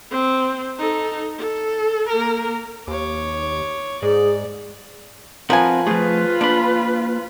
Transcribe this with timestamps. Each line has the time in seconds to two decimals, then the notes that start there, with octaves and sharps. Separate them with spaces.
0.11 C4
0.78 D#4 A4
1.38 A4
2.09 A#3 A#4
2.87 D#2 C#5 D6
4.02 G#2 G#4 D5
5.50 F3 C4 A#4 B4 F#5 G#5
5.87 F3 A3 F4 G#4 B4
6.41 A#3 D4 B5